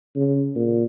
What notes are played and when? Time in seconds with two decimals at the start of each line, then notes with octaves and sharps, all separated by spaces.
0.16 C#3
0.55 A#2